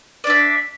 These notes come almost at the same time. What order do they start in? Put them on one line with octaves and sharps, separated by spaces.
D5 D4 E5